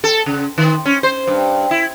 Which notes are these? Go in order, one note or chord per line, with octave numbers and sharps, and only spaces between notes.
A4
C#3
D#3
C#4
C5
G2
E4